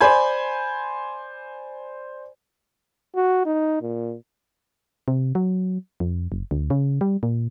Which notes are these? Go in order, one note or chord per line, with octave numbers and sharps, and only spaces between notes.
C5 D5 G#5 B5 G#6
F#4
D#4
A#2
C3
F#3
F2
F#1
D2
C#3
G3
A#2